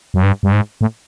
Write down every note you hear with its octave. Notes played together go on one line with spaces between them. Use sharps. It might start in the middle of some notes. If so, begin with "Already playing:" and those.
F#2
G2
G2
G#2
A2